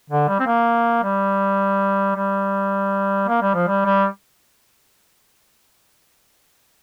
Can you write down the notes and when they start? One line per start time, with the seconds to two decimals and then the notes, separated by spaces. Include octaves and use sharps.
0.10 D3
0.28 G3
0.39 C4
0.46 A#3
1.03 G3
2.16 G3
3.28 A#3
3.41 G3
3.54 F3
3.68 G3
3.85 G3